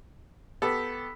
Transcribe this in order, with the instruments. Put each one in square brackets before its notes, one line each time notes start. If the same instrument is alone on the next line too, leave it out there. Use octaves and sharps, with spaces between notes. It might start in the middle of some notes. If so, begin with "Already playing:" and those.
[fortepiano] B3 G4 A4 [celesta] B5 E6 B6